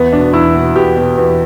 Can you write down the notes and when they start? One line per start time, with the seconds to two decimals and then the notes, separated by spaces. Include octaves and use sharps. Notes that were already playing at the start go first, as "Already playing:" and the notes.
Already playing: E2 B3
0.12 B2 D4
0.33 E2 E4
0.55 B2
0.75 E2 G4
0.96 B2
1.17 E2